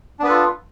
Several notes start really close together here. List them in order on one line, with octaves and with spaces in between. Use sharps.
D4 B3 B4 A4 F4